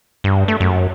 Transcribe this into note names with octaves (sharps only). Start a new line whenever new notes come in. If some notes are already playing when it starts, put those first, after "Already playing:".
G2
A3
F#2